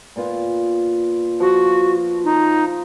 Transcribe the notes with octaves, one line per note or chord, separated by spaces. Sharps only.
A#2 B3 F4
F3 F#4
D#4 C5